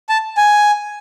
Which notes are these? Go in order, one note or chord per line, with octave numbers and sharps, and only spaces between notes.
A5
G#5